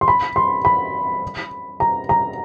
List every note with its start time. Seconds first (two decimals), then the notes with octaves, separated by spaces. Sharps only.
0.01 C6
0.08 B5
0.36 C6
0.65 B5
1.80 A#5
2.09 A#5